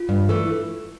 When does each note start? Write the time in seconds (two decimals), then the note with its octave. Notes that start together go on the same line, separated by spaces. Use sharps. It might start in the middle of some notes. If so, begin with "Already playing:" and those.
Already playing: F4
0.09 G2
0.29 E3 A3